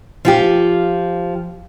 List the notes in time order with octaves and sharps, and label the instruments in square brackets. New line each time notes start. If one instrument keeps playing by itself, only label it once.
[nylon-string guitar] F3 F4 G4